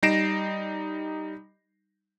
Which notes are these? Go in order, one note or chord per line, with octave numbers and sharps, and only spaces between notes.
G3 D#4 A#6 C7 D7 E7